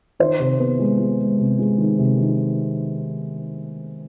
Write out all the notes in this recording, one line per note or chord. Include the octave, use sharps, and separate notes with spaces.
D#3 C5
C3
B3
G#3
G#3
G#3
C3
G#3
D#3
C3
D#3